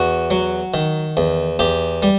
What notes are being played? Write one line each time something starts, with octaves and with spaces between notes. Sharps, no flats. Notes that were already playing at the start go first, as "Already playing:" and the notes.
Already playing: E2 F#4
F#3
D#3
E2
E2 G4
G3